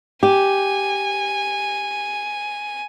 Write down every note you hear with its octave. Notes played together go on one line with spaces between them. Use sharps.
G4 G#5